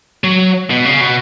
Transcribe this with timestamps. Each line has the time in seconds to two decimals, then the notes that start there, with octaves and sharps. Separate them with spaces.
0.24 F#3
0.70 B2
0.85 C#3
1.01 B2